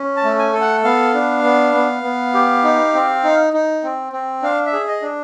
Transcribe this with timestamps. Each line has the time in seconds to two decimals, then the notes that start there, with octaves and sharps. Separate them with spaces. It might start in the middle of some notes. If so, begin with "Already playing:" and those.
Already playing: C#4
0.17 A5
0.24 A3
0.39 G#5
0.54 A4
0.61 F#5
0.84 B3 F5
1.14 D4
1.44 B3
1.74 B3
2.03 B3
2.34 G4
2.64 D#4
2.94 C4
3.24 D#4
3.53 D#4
3.84 C4
4.13 C4
4.42 D4 F5
4.66 E5
4.73 G#4
4.88 D#5
5.02 D4